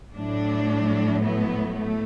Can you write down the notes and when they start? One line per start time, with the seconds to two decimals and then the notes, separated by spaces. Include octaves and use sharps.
0.15 A2 F#3 A3 D4
1.21 B3
1.74 A3